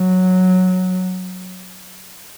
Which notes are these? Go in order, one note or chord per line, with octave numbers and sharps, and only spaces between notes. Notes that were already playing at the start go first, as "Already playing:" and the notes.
Already playing: F#3